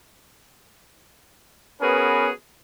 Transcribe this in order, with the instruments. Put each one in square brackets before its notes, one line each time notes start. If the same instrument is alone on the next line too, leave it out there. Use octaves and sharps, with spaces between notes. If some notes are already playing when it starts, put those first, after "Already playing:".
[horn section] B3 C#4 F#4 G#4 A#4 B4